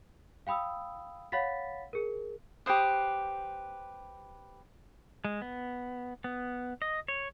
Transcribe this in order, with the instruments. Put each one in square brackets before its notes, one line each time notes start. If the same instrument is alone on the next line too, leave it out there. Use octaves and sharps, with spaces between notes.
[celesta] F5 G5 B5 D#6 E6
C#5 F5 F#5 B5 A6 B6
G#4 A#4
[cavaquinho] G4 B4 C5 D#6
[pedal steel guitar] G#3
B3
B3
D#5
C#5